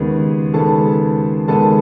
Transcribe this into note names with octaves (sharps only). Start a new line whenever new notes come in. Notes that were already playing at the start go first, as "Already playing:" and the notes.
Already playing: D#2 C#3 G#3 B3
D#2 C#3 G#3 B3 A4 A5
D#2 C#3 G#3 B3 A4 A5